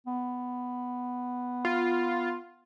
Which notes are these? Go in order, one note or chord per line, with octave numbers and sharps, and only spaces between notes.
B3
F4